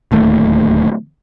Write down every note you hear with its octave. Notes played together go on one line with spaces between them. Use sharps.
D1 D#2 A3